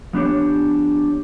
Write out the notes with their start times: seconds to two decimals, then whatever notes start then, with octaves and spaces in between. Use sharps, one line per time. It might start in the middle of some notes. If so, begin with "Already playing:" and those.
0.13 F3 B3 D4 G4 C#5